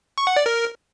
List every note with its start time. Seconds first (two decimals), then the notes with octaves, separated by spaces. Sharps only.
0.18 C#6
0.27 F#5
0.36 D5
0.46 A#4